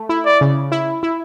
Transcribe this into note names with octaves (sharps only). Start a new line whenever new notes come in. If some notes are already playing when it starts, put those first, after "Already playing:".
Already playing: A3
E4
D5
C#3
E4
E4